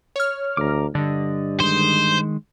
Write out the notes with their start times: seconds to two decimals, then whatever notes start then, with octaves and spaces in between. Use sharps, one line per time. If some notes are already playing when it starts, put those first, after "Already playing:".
0.16 C#5 F6
0.57 D2 A#5 D6
0.95 G2 D3 D5 D#5
1.60 D#3 G#3 C5